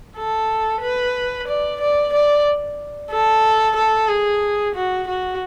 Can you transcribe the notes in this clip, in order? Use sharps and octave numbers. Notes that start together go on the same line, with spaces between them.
A4
B4
D5
D5
D5
A4
A4
G#4
F#4
F#4